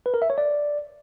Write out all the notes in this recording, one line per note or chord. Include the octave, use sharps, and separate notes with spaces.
B4
A#4
E5
C#5
D5